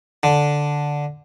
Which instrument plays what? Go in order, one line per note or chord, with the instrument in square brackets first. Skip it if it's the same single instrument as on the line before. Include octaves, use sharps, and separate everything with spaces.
[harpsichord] D3